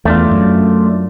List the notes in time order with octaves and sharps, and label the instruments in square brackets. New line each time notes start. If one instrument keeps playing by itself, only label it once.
[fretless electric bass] E2 [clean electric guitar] A3 D4 F4
[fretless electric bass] F#2